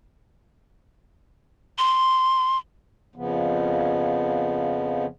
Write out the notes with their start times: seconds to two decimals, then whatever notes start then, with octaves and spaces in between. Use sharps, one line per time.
1.78 C6
3.16 F2 C#3 F3 B3